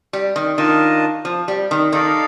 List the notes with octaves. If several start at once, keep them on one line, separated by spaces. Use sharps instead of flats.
G3
D#3
D#3 D4 F4 A#4 D#5 A5
F3
G3
D#3
D#3 D#4 A4 D5 F5